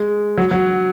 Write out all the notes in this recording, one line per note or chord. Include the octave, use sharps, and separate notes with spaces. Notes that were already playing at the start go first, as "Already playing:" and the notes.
Already playing: G#3
F#3
F#3